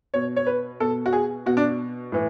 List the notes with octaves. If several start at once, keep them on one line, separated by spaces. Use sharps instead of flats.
B2 C#5
C#5
B4
B2 A4
F#4
G#4
B2 F#4
D4
A2 E3